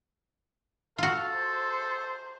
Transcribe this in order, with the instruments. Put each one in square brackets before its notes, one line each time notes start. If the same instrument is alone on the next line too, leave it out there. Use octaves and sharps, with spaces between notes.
[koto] F4 F#4 [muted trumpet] A4 [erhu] F5
[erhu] C5